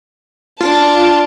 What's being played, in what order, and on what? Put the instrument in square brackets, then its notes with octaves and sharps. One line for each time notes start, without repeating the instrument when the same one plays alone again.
[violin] D4 A5 [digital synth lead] F4